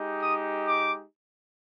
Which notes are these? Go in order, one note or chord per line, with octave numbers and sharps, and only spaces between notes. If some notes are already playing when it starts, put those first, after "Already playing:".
Already playing: G#3 D#4 G4
D#6
D6